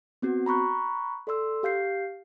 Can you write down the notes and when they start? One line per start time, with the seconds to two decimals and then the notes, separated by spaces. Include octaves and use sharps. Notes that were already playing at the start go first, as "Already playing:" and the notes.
0.22 B3 C4 F#4
0.46 A#5 B5 C#6 F#6
1.27 A4 D5 C6 E6
1.63 G4 F5 G6 C7